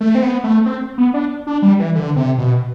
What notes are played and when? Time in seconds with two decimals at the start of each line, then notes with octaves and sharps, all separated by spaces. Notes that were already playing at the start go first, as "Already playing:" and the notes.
0.01 A3
0.15 C4
0.22 B3
0.44 A3
0.66 C4
0.98 B3
1.14 D4
1.47 D4
1.62 G3
1.79 E3
1.95 D3
2.16 C3
2.38 B2